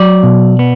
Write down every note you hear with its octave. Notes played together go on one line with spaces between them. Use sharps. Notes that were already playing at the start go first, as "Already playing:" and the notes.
Already playing: F#3 D5
B2
B3